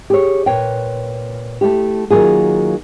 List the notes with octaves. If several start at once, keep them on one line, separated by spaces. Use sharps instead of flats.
G4 G#4 C#5
A#2 B4 C#5 G5
A3 E4 G4
D#3 F#3 A#3 F4 G#4